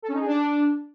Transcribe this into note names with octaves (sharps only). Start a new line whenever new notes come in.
A4
C#4
D#4
G#4
D4